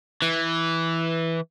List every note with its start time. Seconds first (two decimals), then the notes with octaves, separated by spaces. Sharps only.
0.22 E3